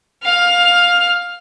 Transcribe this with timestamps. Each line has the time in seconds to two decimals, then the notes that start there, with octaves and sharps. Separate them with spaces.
0.23 F5 F6